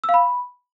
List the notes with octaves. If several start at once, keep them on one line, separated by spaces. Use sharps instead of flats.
E6
F5
B5